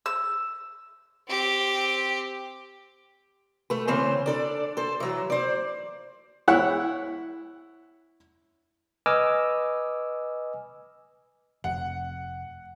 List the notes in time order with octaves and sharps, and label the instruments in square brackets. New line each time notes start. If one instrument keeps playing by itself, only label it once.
[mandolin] E6
[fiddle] C4 G4
[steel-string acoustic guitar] A3 B4
C#3 E3 C4 C5
D4 A4 D5
A4 C5
E3 F#3
C5 D5
[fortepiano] E4 C#5 F#5
[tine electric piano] B4 D#5 G#5 D6 E6 F6
[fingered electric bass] F1 [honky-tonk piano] F#5